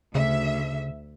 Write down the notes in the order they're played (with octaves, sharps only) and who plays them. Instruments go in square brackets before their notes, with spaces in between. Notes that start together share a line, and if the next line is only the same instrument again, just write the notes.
[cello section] D2 E5 [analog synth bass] C#3